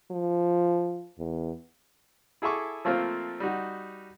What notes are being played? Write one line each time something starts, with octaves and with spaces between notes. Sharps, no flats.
F3
E2
E4 G#4 A4 E5 C#6 D6
F3 A3 A#3 C4 F4
G3 D#4 F#4